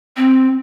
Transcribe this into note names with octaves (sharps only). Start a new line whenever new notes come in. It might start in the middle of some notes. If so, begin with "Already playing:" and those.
C4